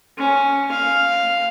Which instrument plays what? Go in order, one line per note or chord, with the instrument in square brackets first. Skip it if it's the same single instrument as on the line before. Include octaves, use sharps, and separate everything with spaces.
[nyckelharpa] C#4
F5